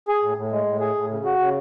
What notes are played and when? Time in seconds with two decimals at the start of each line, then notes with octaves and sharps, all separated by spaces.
0.08 G#4
0.22 A2
0.37 A2
0.52 G#3
0.66 A2
0.80 G#4
0.96 A2
1.10 C#3
1.25 F#4
1.39 C#3